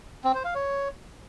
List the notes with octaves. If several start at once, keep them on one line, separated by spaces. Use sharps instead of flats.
C4
C5
F5
C#5